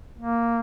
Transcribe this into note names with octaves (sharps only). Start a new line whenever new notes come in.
A#3